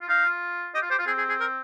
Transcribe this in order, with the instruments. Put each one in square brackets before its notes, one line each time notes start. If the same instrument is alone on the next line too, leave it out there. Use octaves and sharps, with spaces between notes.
[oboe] F4
[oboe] D#4 [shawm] F5
[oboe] F4
[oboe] G4 [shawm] D#5
[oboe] F4
[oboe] G4 [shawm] C5
[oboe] F4
[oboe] C4 [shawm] G#4
[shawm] G#4
G#4
A#4